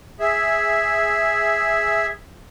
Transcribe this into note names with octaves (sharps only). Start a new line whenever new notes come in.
G#4 E5